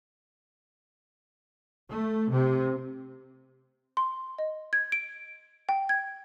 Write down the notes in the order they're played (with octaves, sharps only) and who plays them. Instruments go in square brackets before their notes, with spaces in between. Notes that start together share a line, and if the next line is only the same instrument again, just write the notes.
[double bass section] A3
C3
[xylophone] C6
D#5
G#6
D7
G5
G#6